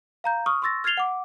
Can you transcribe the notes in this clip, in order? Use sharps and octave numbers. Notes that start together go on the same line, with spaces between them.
F5 A#5 G6
C#6 D#6 F6
C6 C#6 E6 A6 A#6
F6 G#6 A6 C7 F7 G7
F#5 D6